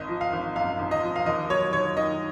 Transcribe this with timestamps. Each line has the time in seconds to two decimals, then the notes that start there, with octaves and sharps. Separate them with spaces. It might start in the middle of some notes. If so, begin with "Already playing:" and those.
Already playing: G#1 D#5
0.09 F3
0.21 F5
0.33 G#1
0.56 F#2 F5
0.79 G#1
0.91 D#5
1.03 F3
1.16 F5
1.26 D#2 D#5
1.50 F#3 C#5
1.73 D#2 C#5
1.97 D#3 D#5